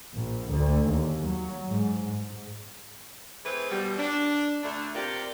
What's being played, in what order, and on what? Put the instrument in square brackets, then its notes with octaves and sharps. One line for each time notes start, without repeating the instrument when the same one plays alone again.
[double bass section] A#1
D2
D#2
F#3
G#2
G#2
[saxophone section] E3 A3 C4 G#4 B4
B2 F3 G3
D4
D2 A3 D4
C3 F4 G4 A#4 D5